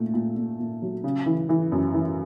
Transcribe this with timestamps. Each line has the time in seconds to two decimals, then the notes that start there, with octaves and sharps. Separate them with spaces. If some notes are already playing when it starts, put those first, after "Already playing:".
Already playing: A#2 A3
0.14 A#2
0.36 A#2
0.59 A#2
0.82 F#3
1.04 C#3
1.26 E3
1.49 E3
1.72 F#2
1.94 E3